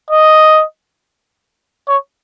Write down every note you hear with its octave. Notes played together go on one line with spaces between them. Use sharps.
D#5
C#5